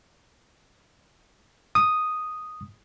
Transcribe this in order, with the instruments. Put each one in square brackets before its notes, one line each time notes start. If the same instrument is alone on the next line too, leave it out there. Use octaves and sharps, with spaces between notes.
[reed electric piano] D#6